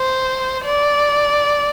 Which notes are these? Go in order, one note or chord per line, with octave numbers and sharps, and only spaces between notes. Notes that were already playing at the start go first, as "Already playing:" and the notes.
Already playing: C5
D5